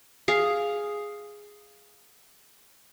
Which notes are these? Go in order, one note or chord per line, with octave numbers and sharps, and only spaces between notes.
G#4 F5